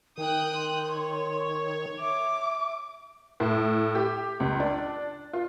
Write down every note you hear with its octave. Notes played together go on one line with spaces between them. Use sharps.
D#3 D#4 G5 D#6 F#6
C6
C#5
E5 D6
A2
G4
C#2
D4
F4